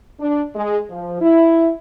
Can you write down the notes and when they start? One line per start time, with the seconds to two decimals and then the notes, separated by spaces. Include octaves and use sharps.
0.20 D4
0.55 G#3
0.90 F3
1.21 E4